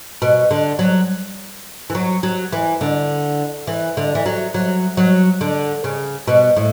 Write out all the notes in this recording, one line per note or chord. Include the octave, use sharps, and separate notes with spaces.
B2
D3
F#3
E3
F#3
F#3
E3
D3
E3
D3
E3
F#3
F#3
F#3
D3
C#3
B2
A2